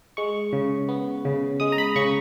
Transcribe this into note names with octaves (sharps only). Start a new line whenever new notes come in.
G#3 C#6
C#3
B3
C#3
G#3 D#6
A#5
B5
C#3 C#6